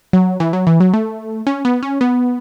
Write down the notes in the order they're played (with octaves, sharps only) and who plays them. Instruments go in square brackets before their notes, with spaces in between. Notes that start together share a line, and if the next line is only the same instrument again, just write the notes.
[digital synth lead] F#3
E3
F#3
E3
F#3
A3
C#4
B3
C#4
B3